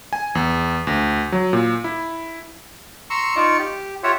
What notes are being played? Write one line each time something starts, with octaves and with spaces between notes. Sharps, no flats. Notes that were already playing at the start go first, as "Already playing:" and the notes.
G#5
E2
D2
F#3
A#2
E4
A#5 C6 C#6 E6
D#4 F4 D5 C#6
G4
F4 G4 C#5 E5 F#5